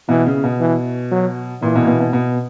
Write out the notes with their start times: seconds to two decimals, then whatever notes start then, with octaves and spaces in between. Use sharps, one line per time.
0.09 B2 E3
0.27 C#3
0.44 B2
0.60 E3
1.11 F#3
1.62 A#2 E3
1.75 B2
1.82 A#2
1.87 B2
2.00 B2
2.13 B2